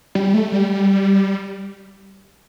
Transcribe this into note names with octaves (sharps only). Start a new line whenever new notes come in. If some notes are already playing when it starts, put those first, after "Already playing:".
G3
A3
G3